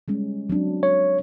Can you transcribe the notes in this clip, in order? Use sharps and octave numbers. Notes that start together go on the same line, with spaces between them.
G3 G#3 C#4
F#3 C4 D4
C#5